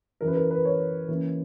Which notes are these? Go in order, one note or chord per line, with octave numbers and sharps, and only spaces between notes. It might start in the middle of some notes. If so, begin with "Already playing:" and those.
F#2 C#3 E3 A#4
B4
A#4
B4
C#5
C#3 E3 A#3